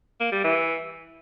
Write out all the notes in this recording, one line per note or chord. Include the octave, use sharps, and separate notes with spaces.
A#3
G3
E3